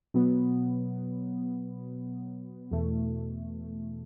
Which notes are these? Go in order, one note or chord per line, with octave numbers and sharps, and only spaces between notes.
B2 F#3 B3
E2 B2 A3